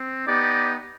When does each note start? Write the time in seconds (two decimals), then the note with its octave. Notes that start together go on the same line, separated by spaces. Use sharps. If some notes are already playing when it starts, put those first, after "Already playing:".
Already playing: C4
0.25 B3 D#4 G4 D5